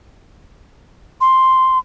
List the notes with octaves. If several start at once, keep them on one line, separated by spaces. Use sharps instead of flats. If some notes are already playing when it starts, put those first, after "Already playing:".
C6